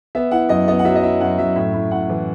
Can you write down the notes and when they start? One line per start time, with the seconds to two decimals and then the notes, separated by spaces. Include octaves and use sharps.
0.15 B3 E5
0.31 E4 F#5
0.49 F#2 D#5
0.68 B3 D#5
0.79 F#5
0.85 F#3 E5
0.96 D#5
1.03 E4 E5
1.20 F#2 F#5
1.39 F#2 E5
1.56 A2 E5
1.74 A2
1.91 A2 F#5
2.09 E3